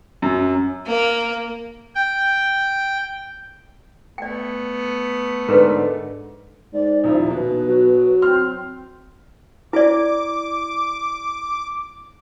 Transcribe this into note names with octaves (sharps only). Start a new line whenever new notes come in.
F#2
A#3
G5
A3 B3 D5 G5
G#2 D3 A#4 B4
G#2 D5
D#1 F3 D#4 E4
B1 B2 B4
F#3
C4 C6 F6
E4 D5 D6